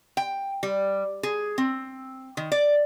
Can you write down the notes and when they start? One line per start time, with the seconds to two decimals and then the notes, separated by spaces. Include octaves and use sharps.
0.17 G5
0.63 G3
1.23 G#4
1.58 C4
2.37 D#3
2.52 D5